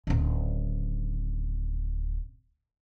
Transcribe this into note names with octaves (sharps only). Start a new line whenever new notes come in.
D1 C#3